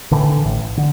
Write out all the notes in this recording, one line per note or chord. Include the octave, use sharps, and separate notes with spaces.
A1 A2 D3 E3
A1 A2
D3